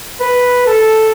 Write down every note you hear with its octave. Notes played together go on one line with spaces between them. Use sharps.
B4
A4